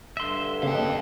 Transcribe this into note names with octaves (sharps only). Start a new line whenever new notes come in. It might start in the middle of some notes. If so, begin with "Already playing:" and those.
G2 D3 E5 C6
C#3 A#3 F5 G5
D#5